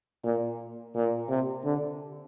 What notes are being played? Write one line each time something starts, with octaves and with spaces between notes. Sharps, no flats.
A#2
A#2
C3
D3